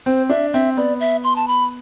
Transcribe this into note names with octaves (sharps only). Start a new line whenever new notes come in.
C4 C5
D4 E5
C4 E5
B3 D5
E5
C6
A5
B5